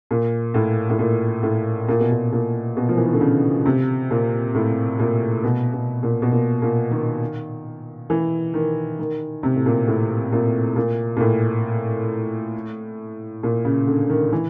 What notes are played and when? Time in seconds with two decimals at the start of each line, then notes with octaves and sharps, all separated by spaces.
0.11 A#2
0.54 A2
0.90 A2
0.99 A#2
1.43 A2
1.88 A#2
2.00 B2
2.11 A#2
2.32 A#2
2.77 B2
2.89 F3
2.97 E3
3.05 D#3
3.13 D3
3.21 C#3
3.66 C3
4.10 A#2
4.55 A2
4.99 A#2
5.44 B2
5.73 B2
6.03 A#2
6.22 B2
6.32 A#2
6.62 A#2
6.91 D#3
8.10 E3
8.54 D#3
8.99 D#3
9.43 C3
9.56 A2
9.66 A#2
9.87 A2
10.32 A#2
10.76 A#2
11.17 A#2
11.20 A2
13.43 A#2
13.65 C#3
13.87 D3
14.10 D#3
14.32 E3